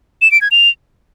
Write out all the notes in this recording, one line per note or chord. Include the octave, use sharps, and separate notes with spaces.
E7
D7
G#6
F7